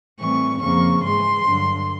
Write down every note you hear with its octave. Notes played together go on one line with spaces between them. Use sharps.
A2 E3 G3 C4 C#6
F2 C#3 F3 A#3 C#6
G#2 E3 G#3 C6
G2 D3 F#3